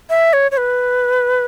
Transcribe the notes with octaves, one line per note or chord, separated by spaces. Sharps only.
E5
C#5
C#5
B4